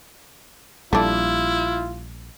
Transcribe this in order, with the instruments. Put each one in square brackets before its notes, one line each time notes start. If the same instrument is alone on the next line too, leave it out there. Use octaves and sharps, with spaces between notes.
[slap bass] A#1 G3 [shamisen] A3 D4 [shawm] E4 [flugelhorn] F4